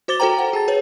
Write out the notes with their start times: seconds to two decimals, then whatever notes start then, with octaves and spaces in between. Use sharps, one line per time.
0.08 F#4 C5 D6 A6 G7
0.20 F#4 A4 C5 G5 A#5
0.39 F#5
0.53 G#4 A5 A6
0.68 G#4 B4 C#5